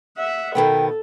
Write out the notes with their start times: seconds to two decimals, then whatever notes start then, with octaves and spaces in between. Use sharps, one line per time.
0.18 E5 F#5
0.55 B2 D#3 B3 A4 G5